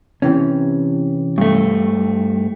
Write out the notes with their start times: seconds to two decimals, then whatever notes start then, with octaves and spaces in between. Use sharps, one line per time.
0.22 C3 E3 C#4
1.38 G2 A3